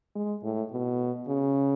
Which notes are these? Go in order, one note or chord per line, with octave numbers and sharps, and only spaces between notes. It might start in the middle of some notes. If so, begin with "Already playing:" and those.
G#3
A2
B2
C#3